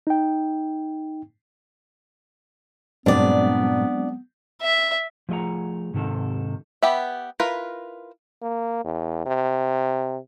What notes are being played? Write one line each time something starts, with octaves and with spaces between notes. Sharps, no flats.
D#4 G5
G2 A#2 F#3 G#3 B3 C4 D4 D5
E5
F3 A3 G#4 D#5 F#5 A#5
G#2 C3 D#3 A4
B3 G4 B4 E5
E4 F4 A#4 B4
A#3
E2
C3